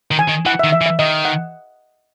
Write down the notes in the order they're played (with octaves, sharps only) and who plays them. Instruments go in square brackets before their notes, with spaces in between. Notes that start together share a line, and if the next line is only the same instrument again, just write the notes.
[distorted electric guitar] D#3
[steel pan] G#5
[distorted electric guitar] D#3
[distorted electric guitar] E3 [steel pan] F#5
[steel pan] E5
[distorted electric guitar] D#3
[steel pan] E5
[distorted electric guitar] E3
[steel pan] E5
[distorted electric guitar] D#3 [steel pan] D#5
[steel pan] F#5